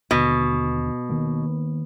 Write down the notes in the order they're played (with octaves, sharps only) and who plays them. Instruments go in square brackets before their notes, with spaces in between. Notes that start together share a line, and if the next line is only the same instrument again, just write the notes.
[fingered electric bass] D#2 D3 [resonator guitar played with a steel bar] B2
[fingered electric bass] D#3 A#3